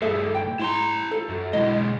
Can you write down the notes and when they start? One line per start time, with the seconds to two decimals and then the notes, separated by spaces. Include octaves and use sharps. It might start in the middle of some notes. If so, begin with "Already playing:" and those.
0.02 G2 A#2 G#4 A4 E5
0.35 G5
0.60 G#2 E4 A#5 C6
1.11 F4 A4
1.29 F#2
1.53 B1 G#3 E4 D#5